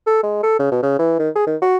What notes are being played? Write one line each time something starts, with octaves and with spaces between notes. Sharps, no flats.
A4
G#3
A4
C#3
B2
C#3
E3
D#3
G#4
D#3
F#4